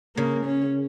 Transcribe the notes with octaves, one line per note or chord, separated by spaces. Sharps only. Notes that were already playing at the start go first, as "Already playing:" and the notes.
C#3 A#3
C#4